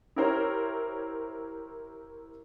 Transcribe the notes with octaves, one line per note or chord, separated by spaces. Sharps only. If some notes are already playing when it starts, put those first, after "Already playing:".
E4 G4 A#4 C5 C#5